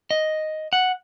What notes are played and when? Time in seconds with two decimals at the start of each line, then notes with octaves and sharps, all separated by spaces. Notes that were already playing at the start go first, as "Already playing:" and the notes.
0.11 D#5
0.73 F#5